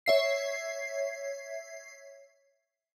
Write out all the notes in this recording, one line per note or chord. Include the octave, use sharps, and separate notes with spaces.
C#5 E5 C7